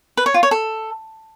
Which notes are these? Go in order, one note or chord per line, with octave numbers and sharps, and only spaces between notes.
B4
C#5
F4
C#5
A4